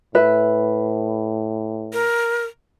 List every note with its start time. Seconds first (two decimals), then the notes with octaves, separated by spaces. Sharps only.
0.15 A2 B4 E5
1.93 A#4